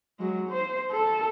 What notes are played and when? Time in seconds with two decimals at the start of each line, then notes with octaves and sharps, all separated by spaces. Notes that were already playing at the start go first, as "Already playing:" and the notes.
0.19 F#3 G#3
0.49 C5
0.91 A4 A5